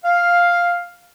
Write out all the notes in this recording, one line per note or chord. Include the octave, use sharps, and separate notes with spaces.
F5